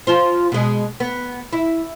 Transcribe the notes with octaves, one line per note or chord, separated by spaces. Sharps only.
F3 F4 C5
B2 G#3
B3
E4